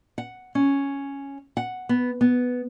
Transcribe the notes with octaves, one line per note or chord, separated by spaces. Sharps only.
F#5
C#4
F#5
B3
B3